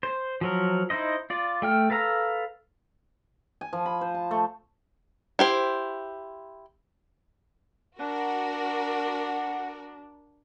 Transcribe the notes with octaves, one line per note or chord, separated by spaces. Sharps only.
C5
F3 F#3 A#4
D#4 E4 C5 D#5
F4 D5
A3 G5 F6
A4 B4 F5 A#5 E6
G#5
F3
B5
C5
A5
A3
E4 G4 C5
D4 F#4 A#4 F#5